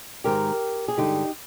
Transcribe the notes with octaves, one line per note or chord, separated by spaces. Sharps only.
G#2 D#3 G#3 G4 A#4
G#4
G2 D3 G#3 D#4 G4